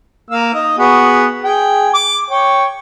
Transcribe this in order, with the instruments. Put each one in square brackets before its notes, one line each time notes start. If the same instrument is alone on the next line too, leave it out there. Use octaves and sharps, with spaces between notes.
[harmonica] A#3 F5 E6
D#4 D#5
B3 F#4 G#4
G#4 G5 G#5
D6
C#5 G5